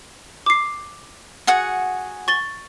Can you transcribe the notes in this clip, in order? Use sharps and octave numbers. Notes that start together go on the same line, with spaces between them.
D6 C7
F#4 G#4 F#5
C#6 A6 G7